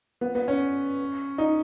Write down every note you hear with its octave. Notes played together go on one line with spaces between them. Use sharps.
B3
B3
C#4
D#4